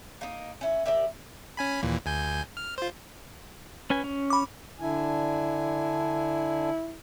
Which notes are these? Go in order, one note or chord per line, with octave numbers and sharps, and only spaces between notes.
A#3 D#4
C#4 E4
G4 A#4 D5 E5
C#4 G#5 B5
D#2 A#2 E3
D2 G#5 G6
F6
F4 C5
C#4 B4 G#5
C#4
B5 D6
D3 D4 E4 G#5